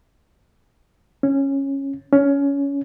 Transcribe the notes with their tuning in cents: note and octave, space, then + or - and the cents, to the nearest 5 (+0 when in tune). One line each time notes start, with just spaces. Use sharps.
C#4 -10
C#4 +20